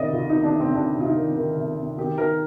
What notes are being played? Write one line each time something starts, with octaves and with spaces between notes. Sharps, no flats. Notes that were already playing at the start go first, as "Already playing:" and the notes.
Already playing: D2 C3 D#3 D5 D#5
D2 F4
D#3 D#4
D4
C3 C4
D2 D4
C3
F4
D#4
D#3
D#3
D2
C3
D#3 G4
D#3 A#4